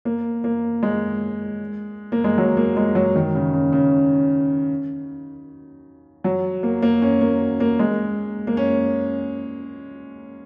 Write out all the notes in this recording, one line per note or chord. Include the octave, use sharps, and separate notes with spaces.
A#3
A#3
G#3
A#3
G#3
F#3
A#3
G#3
F#3
D#3
C#3
C#3
C#3
F#3
A#3
A#3
C#4
A#3
A#3
G#3
A#3
C#4